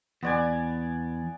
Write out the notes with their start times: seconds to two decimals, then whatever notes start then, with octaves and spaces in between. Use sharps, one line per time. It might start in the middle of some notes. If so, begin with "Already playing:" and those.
0.23 E2 B3 D5 G#5